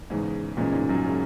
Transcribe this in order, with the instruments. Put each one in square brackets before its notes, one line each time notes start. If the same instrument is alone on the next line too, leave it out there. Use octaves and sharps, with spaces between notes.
[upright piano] E2 C#3 G#3 C#4 [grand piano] G#2
[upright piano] E2 C#3 G#3 C#4 [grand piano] A#2
[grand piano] G#2
F#2
[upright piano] C#3 G#3 C#4